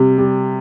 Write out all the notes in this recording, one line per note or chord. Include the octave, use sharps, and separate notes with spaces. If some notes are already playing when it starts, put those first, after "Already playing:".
Already playing: C3 G3
G3